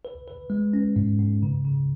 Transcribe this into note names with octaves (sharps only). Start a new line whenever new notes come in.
B4
B4
G#3
C#4
G#2
G#2
C#3
C#3